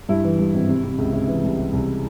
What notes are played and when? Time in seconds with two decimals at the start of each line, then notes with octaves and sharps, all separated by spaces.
0.09 G2 E4
0.24 E3
0.39 G2
0.54 G#1
0.69 C3
0.84 C3
0.98 C#2
1.13 C3
1.27 E3
1.43 C2
1.58 C3
1.73 C2